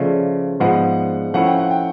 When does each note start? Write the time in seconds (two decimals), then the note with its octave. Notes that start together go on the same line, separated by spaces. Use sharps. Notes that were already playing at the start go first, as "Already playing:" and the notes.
Already playing: C#3 F3 A3 D5
0.60 G#2 F3 G#3 B3 F#5
1.34 F3 A3 C#4 E4 F#5
1.47 G5
1.59 F#5
1.70 G5